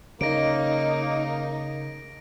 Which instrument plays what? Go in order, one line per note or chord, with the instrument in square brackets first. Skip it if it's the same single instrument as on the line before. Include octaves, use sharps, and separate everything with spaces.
[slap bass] C#3 [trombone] A#3 [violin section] D#4 [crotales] A#6 D7